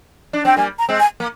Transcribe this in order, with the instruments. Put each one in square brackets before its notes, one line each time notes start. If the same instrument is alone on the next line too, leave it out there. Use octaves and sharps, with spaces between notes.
[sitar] D4
[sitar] C4 [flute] G5
[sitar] G3 A#3 [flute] G#5
[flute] A#5
[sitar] G#3 C4
[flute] G#5
[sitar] A#3